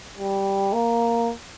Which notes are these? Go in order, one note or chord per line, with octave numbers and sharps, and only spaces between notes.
G3
A#3